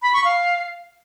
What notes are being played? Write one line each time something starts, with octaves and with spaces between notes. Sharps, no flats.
B5
C#6
F5